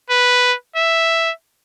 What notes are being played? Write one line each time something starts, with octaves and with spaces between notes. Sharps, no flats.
B4
E5